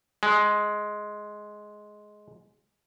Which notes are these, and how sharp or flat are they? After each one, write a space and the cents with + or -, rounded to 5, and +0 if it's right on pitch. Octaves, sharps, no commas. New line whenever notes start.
G#3 +10